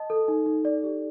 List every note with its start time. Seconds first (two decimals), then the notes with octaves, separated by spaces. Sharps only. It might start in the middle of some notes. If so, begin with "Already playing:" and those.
Already playing: D#5 A5
0.10 A4
0.28 D#4
0.46 D#4
0.65 D5
0.84 G4